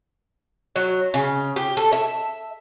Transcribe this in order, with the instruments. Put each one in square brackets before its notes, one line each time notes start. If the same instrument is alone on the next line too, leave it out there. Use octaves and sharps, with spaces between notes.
[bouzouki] F#3
C#3
G4
A4
E5